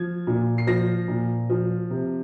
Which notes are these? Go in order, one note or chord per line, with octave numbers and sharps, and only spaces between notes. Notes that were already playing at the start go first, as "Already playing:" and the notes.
Already playing: F3 G#6
A#2
C7
F3 A#6
A#2
F3
C3